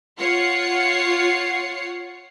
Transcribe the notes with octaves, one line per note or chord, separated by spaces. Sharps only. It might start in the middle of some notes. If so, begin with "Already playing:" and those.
F4 C#5 F#5 C7 C#7